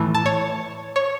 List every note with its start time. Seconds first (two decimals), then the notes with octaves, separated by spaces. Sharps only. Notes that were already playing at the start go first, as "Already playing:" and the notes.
Already playing: A2 E3 A3 E4
0.15 A5
0.26 C#5
0.96 C#5